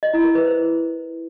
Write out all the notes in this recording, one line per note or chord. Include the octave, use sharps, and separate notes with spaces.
D#5
E4
A#4
B4
C5